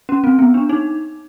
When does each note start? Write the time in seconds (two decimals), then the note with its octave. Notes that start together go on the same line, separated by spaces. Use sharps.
0.09 C#4
0.24 C4
0.39 B3
0.54 D4
0.69 D#4